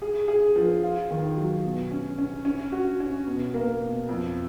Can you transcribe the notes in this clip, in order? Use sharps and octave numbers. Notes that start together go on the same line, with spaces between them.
G#4
G#4
F3
F4
D#3
F#3
B2
C#4
C#4
C#4
F#4
C#4
B2
A#3
B2
F2